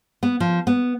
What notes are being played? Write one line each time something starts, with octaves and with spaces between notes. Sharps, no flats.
B3
F3
B3